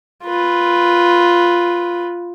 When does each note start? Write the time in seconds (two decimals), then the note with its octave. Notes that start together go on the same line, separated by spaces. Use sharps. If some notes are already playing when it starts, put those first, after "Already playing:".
0.24 F4 B4